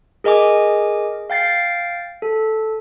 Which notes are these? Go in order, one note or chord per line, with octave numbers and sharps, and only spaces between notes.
G#4 A#4 D#5 G#5 D6
F5 G5 A6 C7
A4